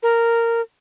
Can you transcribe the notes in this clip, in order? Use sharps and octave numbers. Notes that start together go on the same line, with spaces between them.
A#4